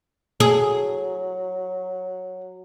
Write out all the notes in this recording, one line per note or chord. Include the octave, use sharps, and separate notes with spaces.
F#3 G#4